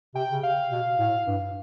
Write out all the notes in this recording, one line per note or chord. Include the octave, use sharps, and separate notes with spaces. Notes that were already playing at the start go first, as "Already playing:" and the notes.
C3 G5
C#3
C3 F5
B2
A2
G2